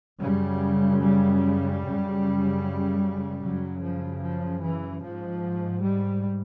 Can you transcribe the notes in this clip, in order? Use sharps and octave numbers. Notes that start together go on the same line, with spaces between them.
F#2 C#3 G3
G3
F#2 C#3
F#2 C#3 F#3
F3
F3
E3
G#2 F3
G3